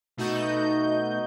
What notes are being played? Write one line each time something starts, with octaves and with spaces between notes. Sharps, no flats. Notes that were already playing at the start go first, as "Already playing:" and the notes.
B2 A3 D#4 F#4 D#5 G6